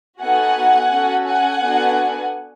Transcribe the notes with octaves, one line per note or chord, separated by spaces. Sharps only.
B3 D#4 F#4 A4 F#5 G#5
C#4 F#4 A4
F#5 G#5
B3 D4 F#4 A4